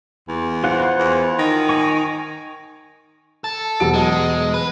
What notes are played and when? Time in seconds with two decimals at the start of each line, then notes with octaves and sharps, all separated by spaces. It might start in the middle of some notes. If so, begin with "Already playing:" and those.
0.28 E2
0.64 F4 C5 F#5
0.98 E2
1.38 D#3
1.69 G#5 C#6
3.44 A4
3.80 E1 F#3 D7
3.94 G#3
4.54 B4